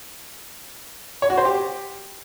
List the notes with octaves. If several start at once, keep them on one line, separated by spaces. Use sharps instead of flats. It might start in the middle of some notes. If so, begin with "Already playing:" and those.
C#5
F#4
C5
G4